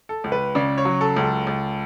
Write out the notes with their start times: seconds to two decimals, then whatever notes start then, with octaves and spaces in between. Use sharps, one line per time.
0.09 A4
0.24 C#2
0.32 B4
0.55 C#3 D5
0.78 C#5
0.85 F#3
1.01 A4
1.16 C#2
1.24 A4
1.47 C#2